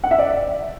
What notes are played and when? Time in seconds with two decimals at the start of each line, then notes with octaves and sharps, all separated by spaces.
0.04 F#5
0.11 E5
0.19 D5